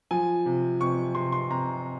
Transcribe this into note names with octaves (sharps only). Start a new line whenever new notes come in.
F3 G#5
C3
C3 C#6
C3 C6
C6
C3 A#5